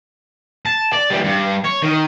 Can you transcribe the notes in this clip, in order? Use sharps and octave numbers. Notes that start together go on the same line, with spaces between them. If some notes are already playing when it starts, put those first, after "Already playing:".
A5
D5
E3 G3
G2
C#5
D#3